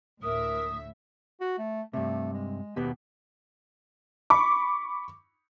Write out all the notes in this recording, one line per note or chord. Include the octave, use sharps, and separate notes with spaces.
D2 A2 A#4 E5 D#6
F#4
A3
G2 C3 A3
G#3
D#2 B2 B3 G4
B5 C#6 D6